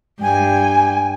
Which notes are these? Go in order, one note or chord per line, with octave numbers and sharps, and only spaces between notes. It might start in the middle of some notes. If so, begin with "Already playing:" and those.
G2 G5 G#5